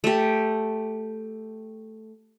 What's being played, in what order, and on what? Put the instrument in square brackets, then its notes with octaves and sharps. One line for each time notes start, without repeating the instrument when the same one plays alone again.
[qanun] A3 G4